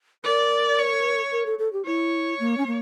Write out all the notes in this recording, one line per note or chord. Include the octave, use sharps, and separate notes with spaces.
A#4 D5
C#5
A#4
A4
A4
G4
E4 C#5
A#3
C#4
A#3